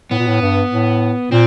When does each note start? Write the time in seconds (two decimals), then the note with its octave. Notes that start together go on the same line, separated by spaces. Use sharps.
0.11 A2 B3
0.19 A#2
0.26 A2
0.41 G2
0.71 A2
1.31 A#2 C4